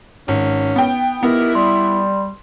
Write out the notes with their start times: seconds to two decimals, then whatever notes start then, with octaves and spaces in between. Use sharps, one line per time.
0.28 G#1 C#4
0.76 B3 G5
1.23 D#3 B3 E4 G4 A#4
1.55 G3 C6